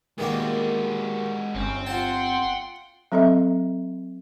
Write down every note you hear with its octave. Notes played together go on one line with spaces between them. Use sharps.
D#3 G3 G#3 A#3 F#4
G1 C4 C#4
F4 F#5 G5 A5 C6
F#3 C4 A4 D#5 E5